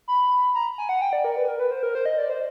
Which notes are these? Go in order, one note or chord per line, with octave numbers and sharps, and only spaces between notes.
B5
A#5
G#5
F#5
G5
D5
A#4
B4
A#4
B4
C5
A#4
C5
D#5
D5
C5